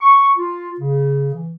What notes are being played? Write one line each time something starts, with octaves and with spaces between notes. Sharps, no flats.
C#6
F4
C#3
E3